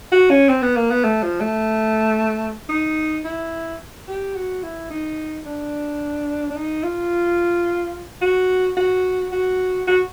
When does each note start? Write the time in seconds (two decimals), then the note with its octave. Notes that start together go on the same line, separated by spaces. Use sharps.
0.12 F#4
0.30 C#4
0.49 C4
0.62 B3
0.76 A#3
0.91 B3
1.04 A3
1.23 F3
1.40 A3
2.69 D#4
3.25 E4
4.08 G4
4.35 F#4
4.63 E4
4.90 D#4
5.46 D4
6.50 D4
6.56 D#4
6.83 F4
8.21 F#4
8.77 F#4
9.32 F#4
9.87 F#4